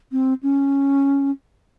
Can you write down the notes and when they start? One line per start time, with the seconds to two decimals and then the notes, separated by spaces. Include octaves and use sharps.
0.12 C4
0.43 C#4